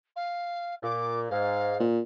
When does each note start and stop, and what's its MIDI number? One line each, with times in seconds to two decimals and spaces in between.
0.16 0.75 77
0.83 1.26 46
0.83 1.20 86
1.31 1.83 44
1.31 1.77 77
1.80 2.01 46